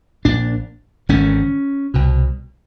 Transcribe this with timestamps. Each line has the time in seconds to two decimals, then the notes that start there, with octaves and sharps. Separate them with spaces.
0.25 A#1 A#2 D4
1.09 G#1 G2 D3 C#4
1.94 C2 B2